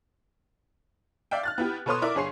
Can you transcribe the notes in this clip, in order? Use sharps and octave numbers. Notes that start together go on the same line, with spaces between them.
D5 E5 F5 G5
F6 F#6 A6
B3 E4 G4
B2 A4 B4 C#5 C6 D#6
E4 A#4 D5 E5 D6
G1 G#4 C#5 C6 C7